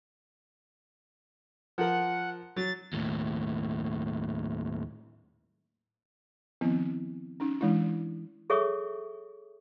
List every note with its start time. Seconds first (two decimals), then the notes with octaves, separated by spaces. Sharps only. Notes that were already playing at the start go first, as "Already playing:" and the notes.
1.78 F3 A#4 F#5
2.56 F#3 A6
2.93 D#2 A2
6.61 D#3 F3 B3 C4 E4
7.40 C#4 D#4
7.61 E3 G#3 D4 E4
8.50 G#4 A4 C#5 E5 C#6 D#6